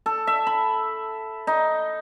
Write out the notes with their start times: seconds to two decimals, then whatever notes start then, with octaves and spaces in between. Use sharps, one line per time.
0.06 A4
0.27 E5
0.47 B5
1.47 D#4